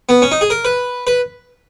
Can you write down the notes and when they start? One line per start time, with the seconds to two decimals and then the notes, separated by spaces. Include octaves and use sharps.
0.09 B3
0.22 C#4
0.32 D#4
0.41 G#4
0.50 A#4
0.65 B4
1.07 B4